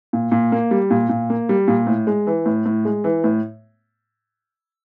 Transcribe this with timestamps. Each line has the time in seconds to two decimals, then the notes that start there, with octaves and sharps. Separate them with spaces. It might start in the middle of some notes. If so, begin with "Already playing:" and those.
0.13 A#2
0.32 A#2
0.52 A#3
0.71 G3
0.91 A#2
1.09 A#2
1.30 A#3
1.49 G3
1.68 A#2
1.87 A2
2.07 G#3
2.27 E3
2.46 A2
2.66 A2
2.85 G#3
3.04 E3
3.24 A2